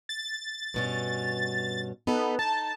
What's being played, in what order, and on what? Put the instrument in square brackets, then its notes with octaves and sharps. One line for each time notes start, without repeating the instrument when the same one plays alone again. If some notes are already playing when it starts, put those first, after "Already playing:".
[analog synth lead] A6
[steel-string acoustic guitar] G2 B2 C#4
[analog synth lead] B3 [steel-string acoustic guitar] D#4 A4
[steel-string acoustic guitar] D#4 [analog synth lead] A5